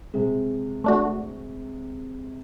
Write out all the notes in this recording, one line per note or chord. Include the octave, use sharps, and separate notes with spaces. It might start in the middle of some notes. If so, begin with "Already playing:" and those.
C3 G#3
A3 D4 F#4